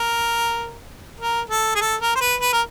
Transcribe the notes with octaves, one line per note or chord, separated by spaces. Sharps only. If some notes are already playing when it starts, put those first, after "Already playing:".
Already playing: A#4
A#4
A4
G#4
A4
A#4
C5
B4
B4
A#4